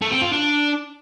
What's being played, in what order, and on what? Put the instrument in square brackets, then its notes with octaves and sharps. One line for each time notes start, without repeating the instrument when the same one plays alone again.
[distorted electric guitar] A3
C4
F4
D4